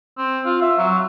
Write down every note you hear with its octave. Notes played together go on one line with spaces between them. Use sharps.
C4
F4
E5
F#3